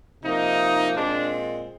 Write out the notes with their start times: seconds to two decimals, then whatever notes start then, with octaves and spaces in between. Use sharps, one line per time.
0.24 C3 F3 A#3 D#4
0.95 A#2 G#3 C4 D4